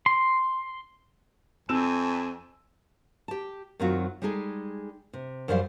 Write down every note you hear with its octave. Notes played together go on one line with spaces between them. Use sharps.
C6
F2 C4 G#5 A5 E6 E7
G4 A5
F#2 D#3 F#3 C4 F4 F#4
G3 G#3 D#4 G#4 A4
C3
F#2 F3 G3 C5 D5 F5